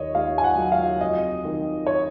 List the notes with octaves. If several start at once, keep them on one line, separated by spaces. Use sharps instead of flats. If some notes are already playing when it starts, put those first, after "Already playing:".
Already playing: D#2 D#3 C#5 D#5
D#2 F5
G#5
F#5
F#3
F5
F2 D#5
D#3
C#5